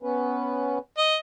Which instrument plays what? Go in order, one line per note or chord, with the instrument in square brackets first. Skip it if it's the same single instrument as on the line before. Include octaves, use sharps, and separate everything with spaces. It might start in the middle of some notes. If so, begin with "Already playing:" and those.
[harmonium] B3 C#4 B4
[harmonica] D#5